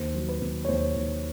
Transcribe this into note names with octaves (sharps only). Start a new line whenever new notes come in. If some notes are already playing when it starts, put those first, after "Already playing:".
Already playing: D#2 C5
F#3
B4
D#2
C#5
D#2 C5
D#2